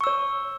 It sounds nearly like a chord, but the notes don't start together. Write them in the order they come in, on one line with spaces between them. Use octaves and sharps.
C#6 E6 C#5